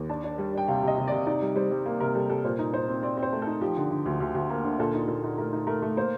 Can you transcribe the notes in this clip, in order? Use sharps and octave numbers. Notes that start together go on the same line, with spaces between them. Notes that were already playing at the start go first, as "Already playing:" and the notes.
Already playing: D#2
D4 A5
D4
G3
D4 G5
C3 F5
C3 D#5
C3
C3 D5
D#4 D5
G3
G3 C5
G3
A#3
C3 A#4
G3 A4
G3 A4
A#2 C5
D#4
D#4 C5
C4
C4 D5
C4
C5
A3
A4
D#4
F3 G4
D3
D3
D2
D2
D2
A#3
D3
A#2 A4
D#4
A#2 A4
D#4
A3 A#4
D#4
A3 A#4
A3
A#3 C5